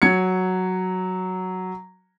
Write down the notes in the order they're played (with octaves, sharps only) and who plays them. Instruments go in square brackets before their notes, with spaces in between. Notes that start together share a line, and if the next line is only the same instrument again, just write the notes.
[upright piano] F#3 G#6 C#7